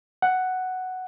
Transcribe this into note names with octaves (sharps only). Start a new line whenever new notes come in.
F#5